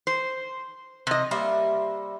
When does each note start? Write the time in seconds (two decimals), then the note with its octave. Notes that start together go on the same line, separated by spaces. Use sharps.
0.07 C5
1.07 C3 D#5
1.31 G3 A#3 C5 E5